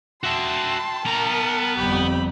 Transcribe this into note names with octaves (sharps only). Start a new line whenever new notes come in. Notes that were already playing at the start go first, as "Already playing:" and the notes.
F#4 E5 G5 A5 C6
B3 A#4 A#5
G1 F2 G4 B5